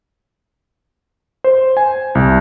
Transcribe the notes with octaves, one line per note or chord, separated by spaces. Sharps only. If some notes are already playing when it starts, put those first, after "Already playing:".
C5
G#5
C2